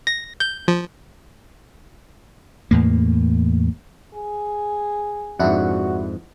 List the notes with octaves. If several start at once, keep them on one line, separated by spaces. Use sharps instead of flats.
A#6
G6
F3
E2 A2 A#3
G#4
F2 G#2 D4 E4 F#4 F#5